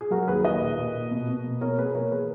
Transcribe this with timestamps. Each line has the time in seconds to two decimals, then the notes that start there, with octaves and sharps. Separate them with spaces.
0.01 G#4
0.11 F#3 F#4 A#4
0.28 D#2 G#4 B4
0.44 D#2 B4 D#5
0.61 A#2
0.78 A#2
0.94 A#3
1.11 B2
1.29 B2
1.44 A#3
1.61 B2 A#4 C#5
1.78 B2 G#4 B4
1.95 A#3 A#4 C#5
2.11 E3 G#4 B4